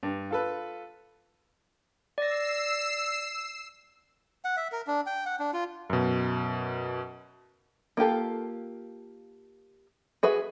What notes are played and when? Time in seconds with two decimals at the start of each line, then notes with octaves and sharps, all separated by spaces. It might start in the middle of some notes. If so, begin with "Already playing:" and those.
0.03 G2
0.31 F4 A4 B4
2.18 D5 E6 A#6 C7 E7
4.45 F#5
4.57 E5
4.72 A#4
4.87 D4
5.07 G5
5.26 F#5
5.39 D4
5.54 F4
5.90 F#2 B2
7.97 A#3 F4 G4 A4
10.23 F#4 G#4 B4 E5